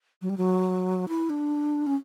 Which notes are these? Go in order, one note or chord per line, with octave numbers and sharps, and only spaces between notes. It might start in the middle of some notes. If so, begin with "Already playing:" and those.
F#3
G3
F#3
E4
D4
C#4